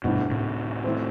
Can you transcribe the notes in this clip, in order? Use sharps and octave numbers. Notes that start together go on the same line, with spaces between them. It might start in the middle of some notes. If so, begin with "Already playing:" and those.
D2 G2 B2 D3 A3 E4
A2 C3
E3 A3 C4